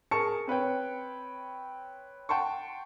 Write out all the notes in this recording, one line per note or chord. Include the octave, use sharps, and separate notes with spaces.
G#4 A#4 A5 C#6 C#7
C4 B4 C#5 G5
F#5 G5 A5 C6 C#6